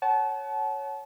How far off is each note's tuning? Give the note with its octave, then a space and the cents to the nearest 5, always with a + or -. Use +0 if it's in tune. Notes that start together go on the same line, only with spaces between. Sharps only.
C#5 +0 F#5 +25 A5 -30